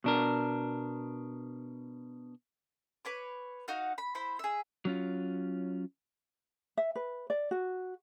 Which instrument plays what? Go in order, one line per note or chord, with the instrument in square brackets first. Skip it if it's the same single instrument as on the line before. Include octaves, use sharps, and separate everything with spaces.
[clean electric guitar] B2 D4 A#4
[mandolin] B4 C#5 D6
D#4 F#4 F5 F#5
B5
E4 C5 B5
G#4 E5
[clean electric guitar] F#3 C#4 F4
[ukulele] E5
B4
D5
F#4